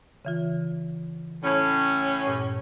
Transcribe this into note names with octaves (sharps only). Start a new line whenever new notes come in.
C#3 E3 F4
A2 C#4
G2 A#2